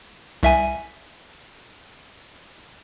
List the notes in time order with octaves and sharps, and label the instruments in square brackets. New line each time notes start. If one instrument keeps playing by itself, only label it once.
[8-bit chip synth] C2 E5 G#5